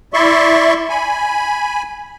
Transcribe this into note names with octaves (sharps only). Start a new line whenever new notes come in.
E4 D5 E5 C6 C#6
G#5 B5